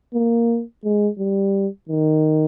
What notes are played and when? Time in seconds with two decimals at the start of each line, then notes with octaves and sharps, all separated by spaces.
0.14 A#3
0.84 G#3
1.19 G3
1.89 D#3